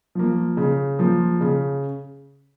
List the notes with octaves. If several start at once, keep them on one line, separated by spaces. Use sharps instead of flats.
F3 A#3
C#3
F3 A#3
C#3